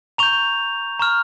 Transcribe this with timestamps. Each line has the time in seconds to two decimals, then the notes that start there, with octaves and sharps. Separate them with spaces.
0.18 A#5 C#6 G6 F7
0.99 A#5 C#6 F6